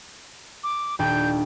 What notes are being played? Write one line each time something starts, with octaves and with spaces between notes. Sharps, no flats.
D6
D#1 D4 G5 G6